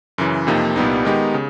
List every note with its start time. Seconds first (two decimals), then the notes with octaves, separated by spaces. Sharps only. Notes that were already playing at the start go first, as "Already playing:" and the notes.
0.18 F#2 C#3 E3
0.47 F2 C3 F3 A#3 D#4
0.76 C2 A#2 G3 B3 D#4
1.05 D#3 G#3 B3 D#4 G4
1.34 C#3